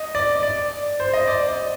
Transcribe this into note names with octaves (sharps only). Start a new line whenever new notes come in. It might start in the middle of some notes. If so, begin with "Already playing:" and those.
Already playing: D#5
D5
D5
C5
D#5
D5
D5